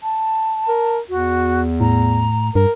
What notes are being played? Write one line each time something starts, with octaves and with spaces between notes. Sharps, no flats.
A5
A#4
E2 F#4
A2 A#5
G2 A#4